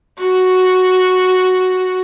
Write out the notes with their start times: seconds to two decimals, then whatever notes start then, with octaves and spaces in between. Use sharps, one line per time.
0.20 F#4